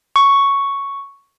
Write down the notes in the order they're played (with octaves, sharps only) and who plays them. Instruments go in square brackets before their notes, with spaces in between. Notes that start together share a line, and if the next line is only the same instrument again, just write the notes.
[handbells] C#6